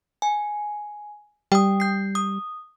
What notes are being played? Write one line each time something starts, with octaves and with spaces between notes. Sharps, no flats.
G#5
G3 G5 D#6
G6 C7
D#6